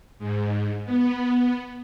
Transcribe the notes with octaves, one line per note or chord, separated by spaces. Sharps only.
G#2
B3